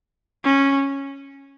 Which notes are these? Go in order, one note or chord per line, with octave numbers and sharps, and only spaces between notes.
C#4